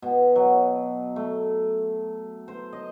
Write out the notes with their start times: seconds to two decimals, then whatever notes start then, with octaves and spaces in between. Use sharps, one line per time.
0.02 B2
0.36 F#3
1.16 A3
2.48 C5
2.73 D#5